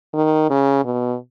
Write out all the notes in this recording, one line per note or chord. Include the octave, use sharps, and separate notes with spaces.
D#3
C#3
B2